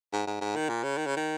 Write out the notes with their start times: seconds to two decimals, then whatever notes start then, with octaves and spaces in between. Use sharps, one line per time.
0.13 G#2
0.27 G#2
0.41 G#2
0.56 D#3
0.69 A#2
0.83 C#3
0.98 D#3
1.06 C#3
1.16 D#3